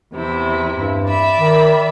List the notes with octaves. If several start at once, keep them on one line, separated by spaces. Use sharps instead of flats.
E2 C3 E4
G2
D5 E5 B5
D#3